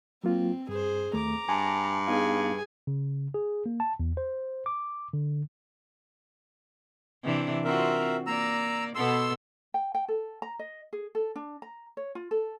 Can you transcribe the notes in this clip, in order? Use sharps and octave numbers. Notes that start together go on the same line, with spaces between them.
F#3 A#3 C4 F4
G2 G#4 C5
D#2 A3 A#5 D6
G2 G#5 A5
B3 D#4 G#4 F5 G#5
C#3
G#4
A#3
A5
E2
C5
D6
D3
C3 E3 D4
C4 F4 F#4 A#4 E5
A#3 D5 A#5 E6
B2 B3 A4 C6 E6
G5
G5
A4
A#5
D#5
G#4
A4
D4
A#5
C#5
F4
A4